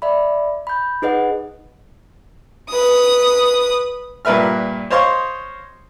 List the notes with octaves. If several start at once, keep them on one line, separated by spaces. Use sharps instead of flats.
D5 E5 B5
B5 G6
D#4 G#4 B4 D#5 F#5
B4 D#6
G2 A#2 A#4 B4 E5 F6
C5 C#5 D#5 F5 C6 C#6